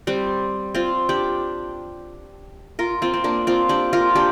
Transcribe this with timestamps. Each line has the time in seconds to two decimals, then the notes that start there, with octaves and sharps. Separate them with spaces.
0.07 G3 C4
0.75 C4 F4
1.09 D4 G4
2.79 F4 A#4
3.02 C4 F4
3.14 C4
3.24 A#3 D4
3.47 C4 F4
3.69 D4 G4
3.93 F4 A#4
4.15 D4 G4